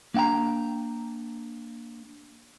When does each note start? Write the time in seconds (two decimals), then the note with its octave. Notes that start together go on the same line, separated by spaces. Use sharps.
0.14 A#3 D4 F#5 G5 A#5